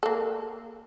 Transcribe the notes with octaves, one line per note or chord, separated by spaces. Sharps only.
A#3 A4